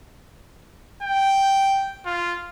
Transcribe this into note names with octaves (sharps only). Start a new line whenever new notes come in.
G5
F4